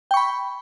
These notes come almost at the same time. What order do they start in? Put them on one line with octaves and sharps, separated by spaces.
G5 C#6 B5